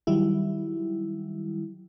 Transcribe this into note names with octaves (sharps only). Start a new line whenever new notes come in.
D#3 F#3 G3 E4